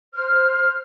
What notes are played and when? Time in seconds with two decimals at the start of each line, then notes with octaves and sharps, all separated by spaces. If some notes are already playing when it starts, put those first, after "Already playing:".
0.14 C5 F6